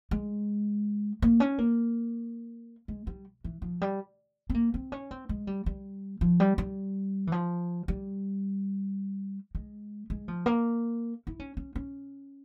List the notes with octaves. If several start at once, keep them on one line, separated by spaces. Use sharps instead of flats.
G#3
A#3
C#4
A#3
G#3
G3
E3
F3
G3
C4
A#3
C4
C#4
C4
G#3
G3
G3
F3
G3
G3
E3
F3
G3
G#3
G#3
F3
A#3
E4
C#4
C#4
C#4